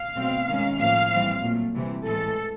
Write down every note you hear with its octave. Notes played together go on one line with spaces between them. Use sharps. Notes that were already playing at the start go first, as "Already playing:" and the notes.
Already playing: F5
B2 F#3 A3 C4
D#3 G#3 C#4
A2 F3 A#3 F5
E3 G3 C4
A#2 F#3 A3
C3 E3 G3
A2 E3 G#3 A4